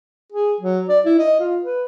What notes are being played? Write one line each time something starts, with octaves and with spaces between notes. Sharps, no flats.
G#4
F#3
D5
E4
D#5
F4
B4